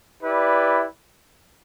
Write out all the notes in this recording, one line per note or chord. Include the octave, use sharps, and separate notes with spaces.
E4 G4 B4 D5